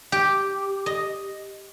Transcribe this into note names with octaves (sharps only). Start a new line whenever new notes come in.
G4
D#5